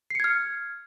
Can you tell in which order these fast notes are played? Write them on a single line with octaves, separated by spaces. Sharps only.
C7 C#7 G#6 F6